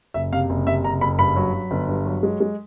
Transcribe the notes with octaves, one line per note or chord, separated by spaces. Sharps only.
F#1 E5
C3 F5
F#1
C3 E5
F#1 A#5
F#1 B5
G2 B5
F#3
F#3
G1
G2
F#3
G#3
G#3